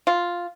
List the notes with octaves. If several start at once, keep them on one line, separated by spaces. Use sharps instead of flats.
F4